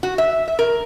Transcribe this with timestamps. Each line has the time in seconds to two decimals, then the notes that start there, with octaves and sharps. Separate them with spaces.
0.03 F#4
0.18 E5
0.48 E5
0.59 A#4